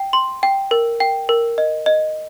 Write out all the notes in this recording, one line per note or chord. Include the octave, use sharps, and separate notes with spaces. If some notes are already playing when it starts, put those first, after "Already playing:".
Already playing: G5
C6
G5
A#4
G5
A#4
D#5
D#5